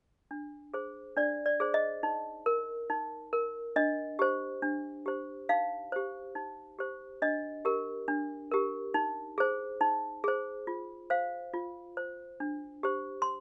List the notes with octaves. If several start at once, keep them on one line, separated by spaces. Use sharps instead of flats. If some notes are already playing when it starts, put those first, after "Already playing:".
D4
G#4 C5
D4 D5
D5
G#4 C5
D#5
D#4
A#4
D#4
A#4
D4 D#5
G4 C5
D4
G4 C5
D#4 F5
G4 C5
D#4
G4 C5
D4 D#5
G4 A#4
D4
G4 A#4
D#4
G#4 C5
D#4
G#4 C5
F4
C5 F5
F4
C5
D4
G4 C5
C6